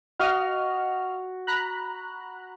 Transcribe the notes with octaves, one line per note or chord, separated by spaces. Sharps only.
F#4 D#5 F5 F6
A#5 B5 F#6